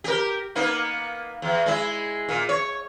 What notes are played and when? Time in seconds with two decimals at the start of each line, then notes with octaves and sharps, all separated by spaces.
0.04 G4 A#4
0.55 A#3 B3 D#4
1.42 E2
1.66 G#3 E4
2.29 A#2
2.49 C#5